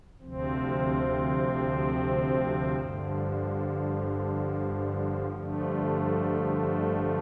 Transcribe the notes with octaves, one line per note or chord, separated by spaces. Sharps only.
D2 C3 F3 C4
G2 D3 F3
G2 D3 F3 A3